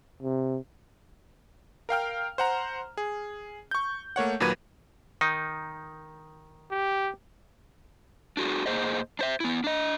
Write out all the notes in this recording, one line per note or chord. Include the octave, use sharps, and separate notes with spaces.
C3
A#4 F5 G5 F6
C5 F#5 A#5
G#4
C#6 G6
A3 A#3 C#5 F#5
D#2 A#2 F#3 B4 G#6 D#7
D#3 D#4
G4
D4 F#4 G#4
A#2 A#3 G#4 C5 D#5
D4 C5 E5
B3 E4
D4 D#5